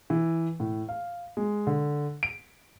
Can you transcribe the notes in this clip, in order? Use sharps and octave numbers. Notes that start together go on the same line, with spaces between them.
E3
A2
F5
G#3
D3
D7